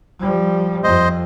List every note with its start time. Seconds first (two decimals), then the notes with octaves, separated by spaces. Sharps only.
0.19 F3 G3
0.84 F2 C5 D#5